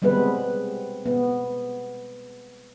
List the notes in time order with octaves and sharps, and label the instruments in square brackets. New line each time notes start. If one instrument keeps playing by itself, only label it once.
[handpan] G3 G#3 B3 C4 B4
B3